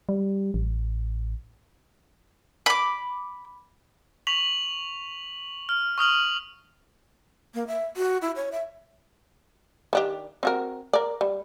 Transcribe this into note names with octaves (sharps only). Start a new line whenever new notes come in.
G3
A1
B5 D6
C#6 B6 F7 F#7
F6
C#6 D#6 F6 F#7
A#3
E5
F#4
E4
C#5
E5
D#3 D4 G4
C4 F#4 A#4
A#4 D5
G3